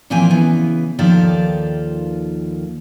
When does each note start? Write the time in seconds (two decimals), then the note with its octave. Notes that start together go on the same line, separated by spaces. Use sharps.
0.10 A#2 E3 F3 A#3 C4 G#5
0.31 C#3 E3 B3
0.99 D#2 D#3 F3 F4 A4 D5